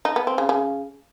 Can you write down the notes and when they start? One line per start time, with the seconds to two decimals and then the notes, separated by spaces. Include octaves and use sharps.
0.05 D#4
0.16 B3
0.27 C4
0.38 C#3
0.49 C#3